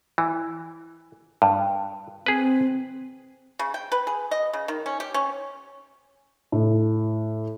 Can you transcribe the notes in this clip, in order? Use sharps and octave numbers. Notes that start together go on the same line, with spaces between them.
E3
G2
C4 G#4 B4
C#3
G5
B4
G#4
D#5
C#3
D#3
C#4
G4
C#4
A2